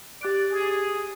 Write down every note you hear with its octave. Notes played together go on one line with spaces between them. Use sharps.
G4 D5 F#6 D7
G#4